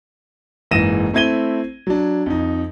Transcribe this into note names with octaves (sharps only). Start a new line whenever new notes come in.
F#1 G#2 E3 A#6 D#7 E7
A3 C4 E4 G#6 D#7 G7
F#3 D4
F2 D#4